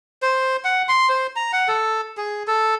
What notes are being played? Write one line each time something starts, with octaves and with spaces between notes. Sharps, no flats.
C5
F#5
C6
C5
A#5
F#5
A4
G#4
A4